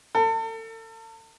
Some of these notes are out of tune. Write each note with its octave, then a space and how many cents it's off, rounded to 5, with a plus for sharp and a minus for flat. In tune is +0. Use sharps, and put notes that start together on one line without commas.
A4 +35